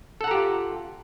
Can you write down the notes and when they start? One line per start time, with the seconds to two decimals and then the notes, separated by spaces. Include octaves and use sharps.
0.21 A4
0.24 F#5
0.28 A#5
0.31 G4
0.35 F4